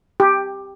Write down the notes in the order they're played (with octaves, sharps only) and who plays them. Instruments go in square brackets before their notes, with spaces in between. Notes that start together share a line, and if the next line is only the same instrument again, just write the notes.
[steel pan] G4